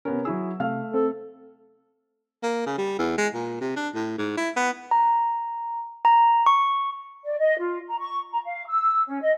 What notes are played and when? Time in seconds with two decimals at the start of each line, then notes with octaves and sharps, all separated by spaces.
0.05 C3 B3 C#4 A#4
0.25 F#3 E4 G#4 E6
0.60 C3 A3 F5 F6
0.94 C4 A4
2.43 A#3
2.66 C#3
2.78 G3
2.98 E2
3.18 G#3
3.34 A#2
3.61 C3
3.76 D4
3.94 A2
4.18 G#2
4.37 E4
4.56 B3
4.91 A#5
6.05 A#5
6.46 C#6
7.24 D5
7.38 D#5
7.59 F4
7.87 A#5
7.99 C#6
8.30 A#5
8.45 F5
8.67 E6
9.07 C#4
9.21 D#5